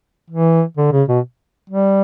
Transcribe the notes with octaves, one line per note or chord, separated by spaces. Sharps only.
E3
D3
C#3
B2
G3